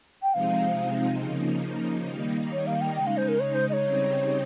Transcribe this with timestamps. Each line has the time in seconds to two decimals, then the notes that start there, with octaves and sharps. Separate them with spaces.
0.23 G5
0.34 C3 F3 G#3 C4 D#4 F5
1.21 C#3 F3 A#3 D#4
2.09 D#3 G3 A#3 D#4
2.52 C#5
2.67 F5
2.81 G5
2.96 C#3 G#3 D#4 G5
3.07 F5
3.17 C5
3.28 A#4
3.40 C#5
3.54 C5
3.69 D#5
3.73 C#5
3.83 C#3 G3 C4 D#4